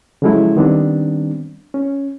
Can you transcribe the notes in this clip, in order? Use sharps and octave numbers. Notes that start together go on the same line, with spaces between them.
C#3 F3 F#3 G#3 A3 E4
D#3 G3 B3 C4 D4
C#4